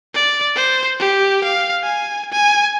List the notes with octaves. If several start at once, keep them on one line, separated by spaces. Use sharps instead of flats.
D5
C5
G4
F5
G#5
G#5